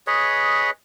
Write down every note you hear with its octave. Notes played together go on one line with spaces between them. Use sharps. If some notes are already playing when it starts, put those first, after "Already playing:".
G#4 B4 C#5 D#5